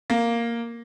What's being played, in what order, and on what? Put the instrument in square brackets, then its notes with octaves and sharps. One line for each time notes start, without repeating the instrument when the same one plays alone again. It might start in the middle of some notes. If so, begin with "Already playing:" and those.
[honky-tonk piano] A#3